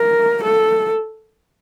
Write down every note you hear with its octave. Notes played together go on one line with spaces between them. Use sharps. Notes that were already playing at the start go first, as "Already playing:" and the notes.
Already playing: A#4
A4